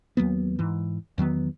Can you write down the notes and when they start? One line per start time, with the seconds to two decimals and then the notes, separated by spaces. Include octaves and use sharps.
0.17 D#2 F#3 A#3 B3
0.59 G#2 E3
1.18 E2 D#3 F#3 B3